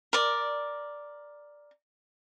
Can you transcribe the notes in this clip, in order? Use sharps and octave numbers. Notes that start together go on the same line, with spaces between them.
A#4 D5